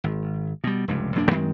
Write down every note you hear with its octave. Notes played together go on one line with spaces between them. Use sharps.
G#1
B2 G3
F1 C#2 G2
E1 F#2 A#3 D4
F#2 D#3 G#3 C4